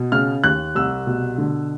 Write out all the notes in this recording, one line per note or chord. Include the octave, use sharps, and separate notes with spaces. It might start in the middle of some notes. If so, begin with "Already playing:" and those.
Already playing: B2
C#3 F6
D#2 F#6
C2 E6
B2
D3